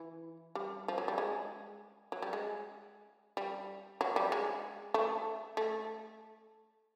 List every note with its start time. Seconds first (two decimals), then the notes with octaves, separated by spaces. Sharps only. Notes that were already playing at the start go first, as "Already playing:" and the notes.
Already playing: E3
0.55 G3
0.88 F3
0.98 F#3
1.08 G3
1.18 G#3
2.12 F#3
2.22 G3
2.33 G#3
3.37 G3
4.01 F#3
4.16 G3
4.32 G#3
4.94 A3
5.57 A3